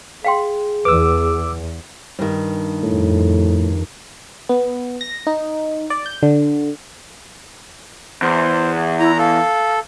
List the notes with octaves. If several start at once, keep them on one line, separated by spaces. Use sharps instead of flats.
G#4 F5 G5 C6
E2 B4 D6 E6
G2 D#3
F2 A2
B3
A#6
D#4
D5
G6
D3
E2 C5
E4 A#5
A4 F5